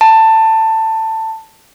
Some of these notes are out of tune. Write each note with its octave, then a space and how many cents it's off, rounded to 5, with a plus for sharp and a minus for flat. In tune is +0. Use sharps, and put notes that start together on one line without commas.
A5 +15